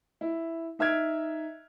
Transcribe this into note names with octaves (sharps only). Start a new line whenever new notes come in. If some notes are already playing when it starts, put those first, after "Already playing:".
E4
D#4 E5 F6 G#6 D7